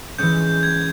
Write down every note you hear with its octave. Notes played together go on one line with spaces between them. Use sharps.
E3 G#3 C#4 G6
G#6